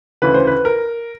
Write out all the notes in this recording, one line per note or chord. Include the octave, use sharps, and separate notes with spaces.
D2 C#3 E3 B4
C5
B4
A#4